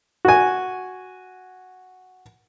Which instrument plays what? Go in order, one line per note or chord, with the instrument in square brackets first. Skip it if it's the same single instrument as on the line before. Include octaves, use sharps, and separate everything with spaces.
[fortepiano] F#4 G#5